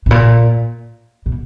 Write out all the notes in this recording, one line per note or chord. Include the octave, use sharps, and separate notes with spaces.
A2
A#2
B2